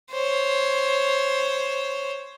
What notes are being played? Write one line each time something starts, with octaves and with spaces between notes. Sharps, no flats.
C5 C#5